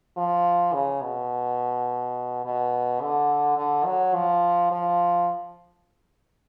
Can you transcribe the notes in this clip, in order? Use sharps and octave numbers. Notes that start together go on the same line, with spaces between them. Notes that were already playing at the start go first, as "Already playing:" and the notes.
F3
C#3
B2
B2
D3
D3
F#3
F3
F3